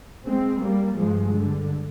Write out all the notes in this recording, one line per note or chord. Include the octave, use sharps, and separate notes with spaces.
G#3 C4
G3 A#3
G2 F3 G#3
D3